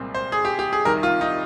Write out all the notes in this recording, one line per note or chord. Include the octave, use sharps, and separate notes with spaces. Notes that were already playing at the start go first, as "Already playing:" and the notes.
Already playing: C2 A#2 G#3 C4
C5
G#4
G4
G4
G#4
C2 C3 D#3 A#4
F4
D#4